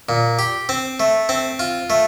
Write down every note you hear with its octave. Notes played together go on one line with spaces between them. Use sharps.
A#2
G4
C4
A3
C4
F4
A3